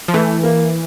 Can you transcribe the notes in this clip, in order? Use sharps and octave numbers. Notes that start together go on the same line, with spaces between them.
F3
E3 A3
A#3